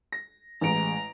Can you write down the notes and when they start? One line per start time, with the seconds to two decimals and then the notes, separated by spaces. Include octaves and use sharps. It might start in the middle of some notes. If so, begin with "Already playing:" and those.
0.12 A#6
0.61 A1 G#3 A#5 D7